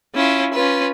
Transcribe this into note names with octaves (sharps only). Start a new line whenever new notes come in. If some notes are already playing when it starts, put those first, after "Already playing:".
C#4 E4 F4
C#4 F4 B4